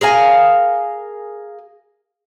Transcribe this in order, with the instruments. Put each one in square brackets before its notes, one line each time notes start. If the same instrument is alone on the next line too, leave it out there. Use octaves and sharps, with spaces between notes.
[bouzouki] G#4 A#4 F5 G#5